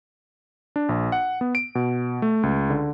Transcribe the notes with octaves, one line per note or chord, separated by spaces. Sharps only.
D4
A#1
F#5
B3
D7
B2
A3
C#2
D3